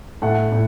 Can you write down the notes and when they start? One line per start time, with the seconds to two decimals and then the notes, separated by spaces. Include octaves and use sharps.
0.22 A2 A3 F#5
0.52 A2